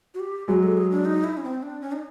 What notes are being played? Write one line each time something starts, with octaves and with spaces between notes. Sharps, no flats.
F#4
G4
F#3 G#3 G4
A4
G#4
D4
D#4
E4
C#4
C4
D4
C#4
D#4